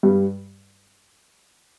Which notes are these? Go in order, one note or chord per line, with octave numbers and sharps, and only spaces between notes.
G2 G3